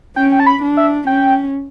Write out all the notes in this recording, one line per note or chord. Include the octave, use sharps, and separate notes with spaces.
C#4 G5
G5
A5
B5
D4
E5
C#4 G5